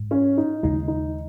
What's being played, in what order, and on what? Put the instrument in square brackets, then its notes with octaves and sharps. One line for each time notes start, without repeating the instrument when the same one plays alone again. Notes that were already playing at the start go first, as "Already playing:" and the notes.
Already playing: [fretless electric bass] G#2 G#3
[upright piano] C#4
D#4
[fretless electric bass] D#2 C#3 G#3 [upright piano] D#4
[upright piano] D#4